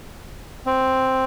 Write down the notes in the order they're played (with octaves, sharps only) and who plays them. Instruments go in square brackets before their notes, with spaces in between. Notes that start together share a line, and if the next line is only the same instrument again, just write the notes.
[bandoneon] C4